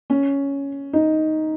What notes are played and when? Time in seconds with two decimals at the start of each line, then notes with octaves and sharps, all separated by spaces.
0.10 C#4
0.93 D#4